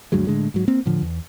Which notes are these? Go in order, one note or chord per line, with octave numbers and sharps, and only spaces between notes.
D2 G2 F#3 G#3
A2 D3 G#3
G#2 F#3
A#3 C4
A2 D3 F3
E2